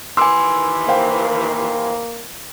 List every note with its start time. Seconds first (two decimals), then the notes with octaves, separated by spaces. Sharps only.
0.17 D#2 D#3 E3 G#5 C6 D6 E6
0.88 A#3 C5 F5 G5